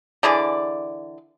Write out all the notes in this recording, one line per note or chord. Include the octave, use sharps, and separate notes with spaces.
D3 E3 G#4 D5